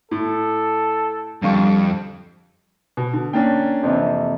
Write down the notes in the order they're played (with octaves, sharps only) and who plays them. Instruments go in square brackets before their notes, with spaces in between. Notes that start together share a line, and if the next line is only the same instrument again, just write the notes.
[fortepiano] A2 [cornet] A4
[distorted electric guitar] F2 [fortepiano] D3 F4 C#6 [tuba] G3
[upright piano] B2
D3
[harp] A#3 [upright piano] C#4 D4 G5
[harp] F2 C3 E3